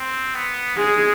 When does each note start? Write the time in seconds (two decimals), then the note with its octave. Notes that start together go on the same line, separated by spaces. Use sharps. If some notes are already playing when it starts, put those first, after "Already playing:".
Already playing: C4
0.35 B3
0.77 G#3 G#4